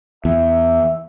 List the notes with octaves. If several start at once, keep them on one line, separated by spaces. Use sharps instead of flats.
E2 E5